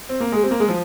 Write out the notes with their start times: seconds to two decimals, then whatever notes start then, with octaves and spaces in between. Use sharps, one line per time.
0.09 C4
0.20 A#3
0.32 G#3 G#4
0.43 C4 G4
0.51 A#3
0.60 G#3 G#4
0.69 F3